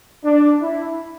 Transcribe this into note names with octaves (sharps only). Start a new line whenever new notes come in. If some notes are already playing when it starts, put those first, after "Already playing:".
D4
E4